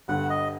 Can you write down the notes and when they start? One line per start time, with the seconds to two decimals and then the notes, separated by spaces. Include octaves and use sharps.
0.08 G1 G2 D3 F#5
0.30 D#5